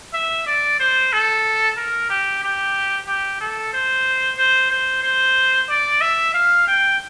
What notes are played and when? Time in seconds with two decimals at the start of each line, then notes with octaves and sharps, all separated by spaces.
0.13 E5
0.46 D5
0.80 C5
1.12 A4
1.77 A#4
2.10 G4
2.43 G4
3.07 G4
3.41 A4
3.73 C5
4.38 C5
4.70 C5
5.03 C5
5.69 D5
6.01 E5
6.34 F5
6.67 G5